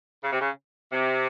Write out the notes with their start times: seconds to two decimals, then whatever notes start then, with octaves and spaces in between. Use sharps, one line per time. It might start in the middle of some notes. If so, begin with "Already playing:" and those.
0.23 C#3
0.32 C3
0.39 C#3
0.92 C3